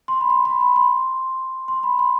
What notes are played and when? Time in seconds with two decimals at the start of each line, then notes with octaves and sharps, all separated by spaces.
0.08 C6
0.21 B5
0.30 C6
0.45 B5
0.61 B5
0.76 C6
1.68 C6
1.83 B5
1.99 C6